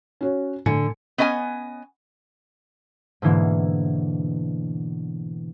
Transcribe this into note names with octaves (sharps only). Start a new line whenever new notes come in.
C#4 F#4 C#5
A2 D3 G#5 C#7
B3 C#4 D#5 E5 G#5
G#2 B2 D3 E3 A#3